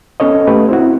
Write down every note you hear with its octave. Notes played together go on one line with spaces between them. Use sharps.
B3 C#4 A4 C#5 D#5
A3 G4 B4
C4 E4 F#4